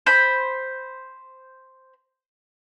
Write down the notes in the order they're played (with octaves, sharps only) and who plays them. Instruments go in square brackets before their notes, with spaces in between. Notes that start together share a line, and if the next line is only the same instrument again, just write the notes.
[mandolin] C5 B5